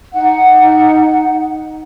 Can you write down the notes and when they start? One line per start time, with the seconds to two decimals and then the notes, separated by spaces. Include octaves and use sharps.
0.13 D#4 F#5